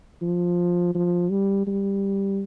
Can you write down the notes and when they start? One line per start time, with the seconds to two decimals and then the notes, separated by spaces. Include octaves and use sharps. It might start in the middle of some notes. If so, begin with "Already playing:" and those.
0.22 F3
0.95 F3
1.31 G3
1.67 G3